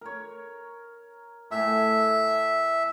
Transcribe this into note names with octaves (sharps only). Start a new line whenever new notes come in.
A#4 C#5
A2 E5 G#5